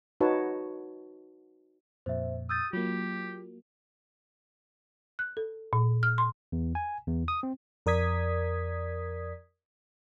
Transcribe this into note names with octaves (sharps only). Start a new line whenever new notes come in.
D#4 F#4 B4 C#5 A5
F2 A#2 C5 E5
D#6 E6 G6 A6
F#3 A#3 F4 G4
F#6
A4
A#2
F6
C6
E2
G#5
E2
D#6
C4
F2 A#4 D5 D#6 G#6 B6